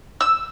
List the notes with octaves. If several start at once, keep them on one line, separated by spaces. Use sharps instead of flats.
E6